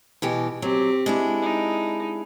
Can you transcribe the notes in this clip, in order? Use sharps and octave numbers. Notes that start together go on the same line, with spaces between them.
B2 E3 G4
F#3 C4 G4
G#3 D4 E4
D#4